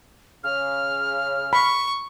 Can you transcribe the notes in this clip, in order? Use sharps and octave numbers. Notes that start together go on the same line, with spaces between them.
C#3 F6
B5 C#6